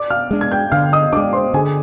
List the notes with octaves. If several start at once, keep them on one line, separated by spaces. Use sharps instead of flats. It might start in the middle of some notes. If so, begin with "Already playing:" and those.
Already playing: D5 D6
F5 F6
G#3 D4
G#6
G5 G6
D3 F5 F6
D#5 D#6
G#3 D4 D5 D6
C5 C6
D3 G#4 G#5